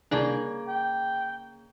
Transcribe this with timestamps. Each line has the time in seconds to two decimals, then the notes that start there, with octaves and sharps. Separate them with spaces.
0.11 C2 C#3 A#3 D4 G#4
0.68 G5